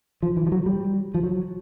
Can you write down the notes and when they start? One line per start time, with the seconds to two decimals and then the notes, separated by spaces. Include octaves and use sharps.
0.23 F3
0.37 E3
0.47 F3
0.52 F#3
0.66 G3
1.14 F3
1.23 F#3